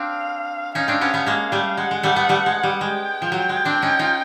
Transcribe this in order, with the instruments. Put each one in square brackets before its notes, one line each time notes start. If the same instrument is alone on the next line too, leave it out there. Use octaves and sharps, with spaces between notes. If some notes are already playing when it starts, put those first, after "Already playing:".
Already playing: [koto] C4 D4 [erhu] F5
[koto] C#4 D#4 [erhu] F5
[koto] C4 D4
B3 C#4
A3 B3
G#3 A#3
G3 A3
[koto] G#3 [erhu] F#5
[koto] G#3
G3 A3
A3 B3
G3 A3
G#3
G3
[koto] G#3 [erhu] G5
[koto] F3
F#3
G#3
C4 D4
C#4 D#4
D#4 F4